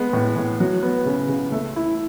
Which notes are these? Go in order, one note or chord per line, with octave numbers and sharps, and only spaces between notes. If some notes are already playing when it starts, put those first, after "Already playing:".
Already playing: G#3 B3
A2
A2
F#3
B3
C#3
C#3
A3
E4